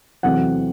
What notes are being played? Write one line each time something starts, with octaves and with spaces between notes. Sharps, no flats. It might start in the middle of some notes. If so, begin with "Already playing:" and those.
E2 C3 F#3 A3 C4 F#5